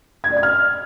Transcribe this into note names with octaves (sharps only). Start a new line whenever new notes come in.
G#6
D5
G#6
F6